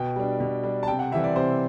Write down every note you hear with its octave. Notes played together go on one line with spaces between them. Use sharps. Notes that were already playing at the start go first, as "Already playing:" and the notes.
Already playing: B2 G5
G3 D4
B2
G3 D4
A5
C3 G5
F#5
E3 G3 C4 E5
D5
C3 C5